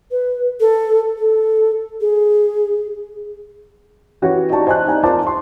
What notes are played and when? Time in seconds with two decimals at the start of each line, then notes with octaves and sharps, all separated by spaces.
0.11 B4
0.60 A4
1.18 A4
2.01 G#4
4.22 E3 C#4 F#4 G4 B4 C#5
4.50 D#4 F#4 G4 D5 A5 C#6
4.67 C5 D#5 G#5 A5 F#6
4.87 D#4 E4 G4 D5 G#5 A#5
5.03 F4 A#4 C5 D5 A5 D6
5.27 C6